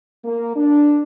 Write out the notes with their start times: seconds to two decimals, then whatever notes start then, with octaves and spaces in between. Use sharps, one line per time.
0.25 A#3
0.56 D4